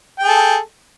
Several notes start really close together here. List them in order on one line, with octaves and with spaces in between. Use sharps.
G5 G#4 A4